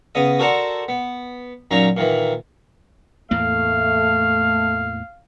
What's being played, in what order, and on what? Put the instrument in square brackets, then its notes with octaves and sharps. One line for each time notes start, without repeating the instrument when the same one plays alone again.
[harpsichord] C#3 B3 D#5 D#6
F#4 A4 A#4 C5 D5 F#5
B3
A#2 F#3 C#4 D#4 A#5
A#2 D#3 E3
[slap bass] E2 A2 A#3 [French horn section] A3 [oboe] F5